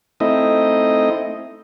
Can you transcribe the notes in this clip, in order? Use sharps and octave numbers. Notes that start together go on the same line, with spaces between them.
A3 C4 D#4 E4 D#5